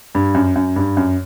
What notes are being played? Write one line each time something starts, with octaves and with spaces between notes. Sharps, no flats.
G2
F#2
F#2
G2
F#2